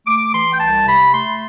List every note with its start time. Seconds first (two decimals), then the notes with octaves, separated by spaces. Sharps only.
0.06 A3 D6
0.32 E3 C6
0.52 G5
0.59 C2 A5
0.86 C3 B5
1.12 A3 C6